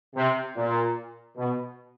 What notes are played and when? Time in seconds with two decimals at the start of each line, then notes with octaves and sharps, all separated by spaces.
0.15 C3
0.56 A#2
1.37 B2